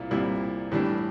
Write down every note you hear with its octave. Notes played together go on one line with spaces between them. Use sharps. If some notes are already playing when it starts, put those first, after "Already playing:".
Already playing: C2 A#2 A#3 E4
C2 A#2 G3 A#3 E4
A2 E3 G3 D4